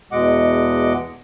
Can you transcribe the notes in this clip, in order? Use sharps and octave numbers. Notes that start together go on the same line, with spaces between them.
E2 B2 G#3 D#5 F#5 D6